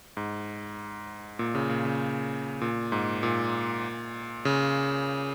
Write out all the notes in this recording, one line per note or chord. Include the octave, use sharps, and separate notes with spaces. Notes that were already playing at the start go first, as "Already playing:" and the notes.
G#2
A#2
C#3
A#2
C#3
A#2
G#2
A#2
C#3